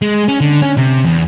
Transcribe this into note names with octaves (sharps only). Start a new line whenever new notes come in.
G#3
C#4
D3
C#4
C3
E2